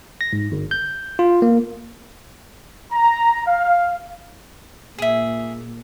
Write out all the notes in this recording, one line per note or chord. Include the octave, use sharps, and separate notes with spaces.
A#6
G#2
G1
G6
F4
A#3
A#5
F5
A#2 G#4 E5